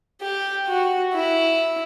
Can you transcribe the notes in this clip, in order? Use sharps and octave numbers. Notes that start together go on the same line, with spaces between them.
G4
F#4
E4